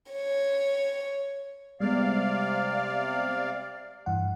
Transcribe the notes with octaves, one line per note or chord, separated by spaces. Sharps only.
C#5
C3 G3 G#3 B3 D5 F5
G2 E3 F#5